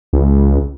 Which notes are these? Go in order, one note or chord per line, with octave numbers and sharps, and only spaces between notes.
C#2